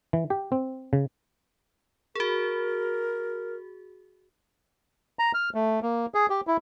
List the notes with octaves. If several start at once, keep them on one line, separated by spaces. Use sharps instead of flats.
E3
G4
C4
C#3
F#4 G#4 A#4
A#5
F6
A3
A#3
G#4
G4
E4